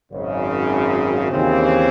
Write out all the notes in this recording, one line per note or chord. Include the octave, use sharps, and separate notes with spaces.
G#1 F#2 C#3
D#2 C#3 E3 C4